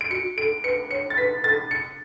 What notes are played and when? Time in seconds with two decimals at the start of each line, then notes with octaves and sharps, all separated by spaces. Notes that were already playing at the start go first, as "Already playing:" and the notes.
0.01 D7
0.10 F#4 C#7
0.37 A4 D7
0.64 B4 C#7
0.91 C#5 C#7
1.10 A6
1.17 B4 B6
1.44 A4 A6
1.71 C#7